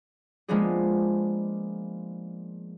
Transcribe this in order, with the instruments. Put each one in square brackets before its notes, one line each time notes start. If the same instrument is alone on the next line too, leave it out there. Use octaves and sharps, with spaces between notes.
[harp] F3 G#3 A#3 B3 D4 G#4